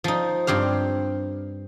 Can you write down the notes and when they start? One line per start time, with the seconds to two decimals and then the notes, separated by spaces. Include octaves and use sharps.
0.04 F3 D#4
0.47 G2 C4 G4 F5